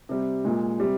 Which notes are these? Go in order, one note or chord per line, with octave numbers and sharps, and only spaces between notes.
C3 G3
A#2 G#3
C3 G3